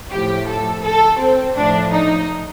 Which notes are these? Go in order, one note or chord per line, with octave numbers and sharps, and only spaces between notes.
A2 F3 G4
A4
A4
C4
A2 F3 D4
D#4